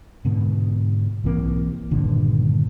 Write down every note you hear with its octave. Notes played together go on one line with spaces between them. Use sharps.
G#2 B2 D3
B1 E3 A#3 C4
G1 A#2 D3 D#3